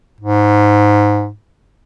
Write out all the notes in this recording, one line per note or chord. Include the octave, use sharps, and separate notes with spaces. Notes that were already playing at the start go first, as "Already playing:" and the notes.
G#2